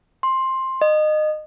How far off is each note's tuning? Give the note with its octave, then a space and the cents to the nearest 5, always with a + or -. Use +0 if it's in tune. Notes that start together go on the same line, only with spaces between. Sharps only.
C6 +10
D#5 -25